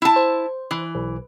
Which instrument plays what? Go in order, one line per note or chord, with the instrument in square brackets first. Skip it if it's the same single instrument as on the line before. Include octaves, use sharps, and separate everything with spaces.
[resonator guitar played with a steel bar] E4 A5
[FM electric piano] C5
[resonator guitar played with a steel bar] E3
[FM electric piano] B1